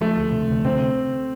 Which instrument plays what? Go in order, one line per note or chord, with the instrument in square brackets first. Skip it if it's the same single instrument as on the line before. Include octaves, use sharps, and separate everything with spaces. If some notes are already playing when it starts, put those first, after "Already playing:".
[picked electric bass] F3 [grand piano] A3
[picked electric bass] D2
C3
D2
[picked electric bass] C3 [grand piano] C4